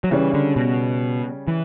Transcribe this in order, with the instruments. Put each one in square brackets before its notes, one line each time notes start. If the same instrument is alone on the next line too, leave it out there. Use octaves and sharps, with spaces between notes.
[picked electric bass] F#3
[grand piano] C#3 G3 C#4 [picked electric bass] E3
[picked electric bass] D3
B2
E3